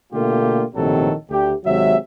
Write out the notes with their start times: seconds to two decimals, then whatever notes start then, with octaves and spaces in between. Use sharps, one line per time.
0.12 B2 D3 A3 A#3 F4 G4
0.75 A#1 A2 C3 D#3 F#3 A4
1.30 D2 G4
1.65 D#2 C3 F#3 G#3 E5